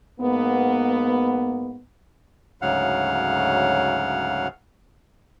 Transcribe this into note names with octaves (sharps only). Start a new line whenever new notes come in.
G#2 A#3 B3
D2 G#2 C#3 F#3 F5 F#5